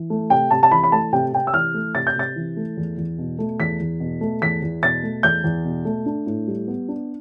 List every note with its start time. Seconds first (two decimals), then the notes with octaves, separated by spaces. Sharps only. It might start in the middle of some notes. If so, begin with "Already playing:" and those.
Already playing: E3
0.10 A3
0.30 C3 G5
0.51 C3 A5
0.63 A5
0.71 E3 B5
0.83 B5
0.92 A3 A5
1.13 C3 G5
1.33 C3 G5
1.47 E6
1.54 E3 F6
1.74 A3
1.95 C3 A6
2.07 G6
2.15 C3 A6
2.36 E3
2.57 A3
2.77 E2
2.97 E2
3.18 B2
3.39 A3
3.59 E2 B6
3.80 E2
4.00 B2
4.21 A3
4.42 E2 B6
4.62 E2
4.83 B2 A6
5.03 A3
5.23 E2 G6
5.44 E2
5.65 B2
5.85 A3
6.06 D4
6.26 A2
6.48 G3
6.68 B3
6.88 D4